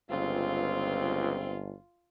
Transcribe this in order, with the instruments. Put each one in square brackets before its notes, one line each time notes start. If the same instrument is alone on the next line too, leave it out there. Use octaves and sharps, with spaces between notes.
[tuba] G1 [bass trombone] C#2 [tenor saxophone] C4 [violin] F4